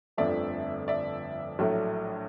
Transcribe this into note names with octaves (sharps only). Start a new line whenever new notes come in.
G1 F2 D3 F3 A3 D5 E5
D5 E5
A#1 A2 F#3 A3